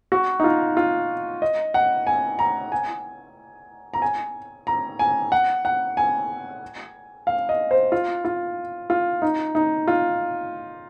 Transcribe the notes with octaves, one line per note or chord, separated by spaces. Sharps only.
F#4
D#4
F4
F4
D#5
F#5
G#5
A#5
G#5
A#5
G#5
A#5
G#5
F#5
F#5
G#5
F5
D#5
C5
F4
F4
F4
D#4
D#4
F4